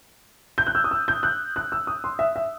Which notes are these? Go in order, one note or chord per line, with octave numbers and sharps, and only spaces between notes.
G6
F#6
E6
D#6
E6
G6
F#6
F#6
E6
D#6
C6
E5
E5